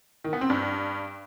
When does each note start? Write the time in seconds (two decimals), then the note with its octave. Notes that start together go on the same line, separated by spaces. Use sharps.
0.24 D#3
0.33 B3
0.41 C4
0.50 G2